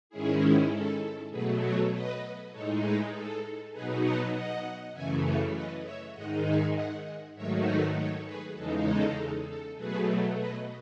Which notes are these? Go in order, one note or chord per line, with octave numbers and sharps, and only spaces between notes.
G#2 D#3 G#3 C#4 E4 G#4
A4
B2 F#3 A3 G#4 B4
C#5 E5
B4 D#5
A2 G#3 D#4 A4 C#5
G#4 B4
A4
B2 F#3 B3 D#4 G#4 B4
F#5 A5
D#5 F#5
F#2 C#3 E3 A3 E5 G#5
A4 C#5
B4 D#5
C#5 E5
G#2 D#3 G#3 D#4 D#5 F#5
E5 G#5
D#5 F#5
G#2 D#3 F#3 A3 D#4 C#5 E5
B4 D#5
A4 C#5
G#4 B4
E2 C#3 G#3 D#4 A4
A4
A4
B2 F#3 A3 G#4 B4
B4 D#5